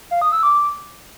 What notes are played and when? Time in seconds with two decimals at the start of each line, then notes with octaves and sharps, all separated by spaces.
0.11 F5
0.22 D#6
0.32 E6
0.43 D6